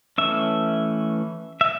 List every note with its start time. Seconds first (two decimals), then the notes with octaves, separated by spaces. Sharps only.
0.18 E3 A3 C#4 E5
1.61 E5